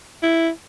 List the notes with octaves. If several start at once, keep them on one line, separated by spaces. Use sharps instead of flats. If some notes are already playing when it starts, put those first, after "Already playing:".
E4